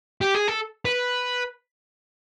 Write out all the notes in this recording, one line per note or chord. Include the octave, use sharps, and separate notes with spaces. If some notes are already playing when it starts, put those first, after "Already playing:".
G4
G#4
A4
B4